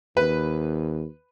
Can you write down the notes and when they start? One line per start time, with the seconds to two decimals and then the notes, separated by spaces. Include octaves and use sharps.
0.17 D#2 B4